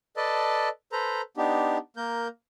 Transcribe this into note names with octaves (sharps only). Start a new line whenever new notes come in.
A4 B4 D5 D#5 A5
A4 B4 C5 A#5
B3 D4 D#4 G4
A#3 A#4 G6